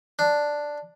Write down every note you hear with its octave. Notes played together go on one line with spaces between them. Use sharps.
D4